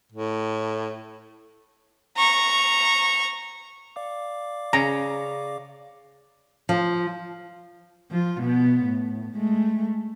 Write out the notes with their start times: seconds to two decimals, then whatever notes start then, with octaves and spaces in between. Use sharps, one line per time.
0.12 A2
2.17 A#5 C#6
3.96 D5 F5 D6
4.73 C#3 A#5
6.69 F3
8.11 F3 F4
8.41 B2 B3
8.85 A2
9.34 G#3 A3